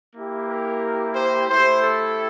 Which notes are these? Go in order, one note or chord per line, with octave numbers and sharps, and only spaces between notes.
A#3 E4 G4
A#4
C5
A3 E4 G4 C5
A4